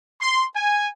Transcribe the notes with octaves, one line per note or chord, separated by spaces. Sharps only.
C6
G#5